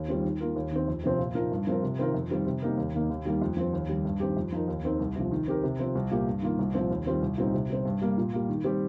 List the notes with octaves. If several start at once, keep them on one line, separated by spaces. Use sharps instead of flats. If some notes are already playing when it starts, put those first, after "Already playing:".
Already playing: D#2
D#3 G3 C4 F4
D#3
A#3 F4 A#4
D#2
D#3 C4
F2
C3 F3 C4
A#2
F3 D#4 A#4
G2
F3 C4 F4 A#4
C3
D#3 C4 F4 A#4
F2
D#3 G3 C4 F4
C3
G3 A#3 D#4 A#4
D#2
D#3 A#3 D#4
D#2
D#3 G3 A#3
F2
F3 C4
D#2
D#3 G3
G2
D#3 C4 G4
F2
F3 D#4 A#4
D#2
D#3 C4 D#4 A#4
C2
C3 F3
D#3
C4 G4 A#4
C3
F3 C4
C2
A#2 A#3 G4
G2
D#3 A#3 F4
C2
A#2 F3 C4
D#2
D#3 G3 C4 F4
C2
A#2 G3 C4 D#4
C3
G3 C4
G2
G3 A#3
A#2
G3 A#3
D#3
G3 C4 G4